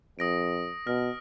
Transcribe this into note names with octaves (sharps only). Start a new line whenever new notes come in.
F2 D#6 A#6 D7
B2 F6 A#6